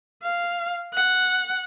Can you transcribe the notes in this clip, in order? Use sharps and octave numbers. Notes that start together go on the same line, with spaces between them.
F5
F#5